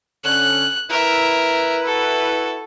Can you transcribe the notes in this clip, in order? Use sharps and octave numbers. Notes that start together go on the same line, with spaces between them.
D3 C#4 F#6
E4 A#4 B4 E5
F#4 A4